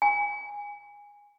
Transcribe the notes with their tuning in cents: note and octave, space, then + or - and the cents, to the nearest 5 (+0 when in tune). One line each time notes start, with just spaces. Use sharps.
G#5 -20